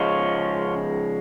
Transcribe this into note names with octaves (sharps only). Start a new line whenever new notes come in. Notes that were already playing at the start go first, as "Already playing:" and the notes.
Already playing: C#3 F3 G#3 C#4 F4